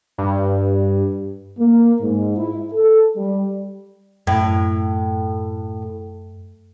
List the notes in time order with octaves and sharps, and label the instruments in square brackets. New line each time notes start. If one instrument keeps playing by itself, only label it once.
[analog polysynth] G2
[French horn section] A#3
G#2
E4
A4
G3
[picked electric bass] F#2 [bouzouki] A2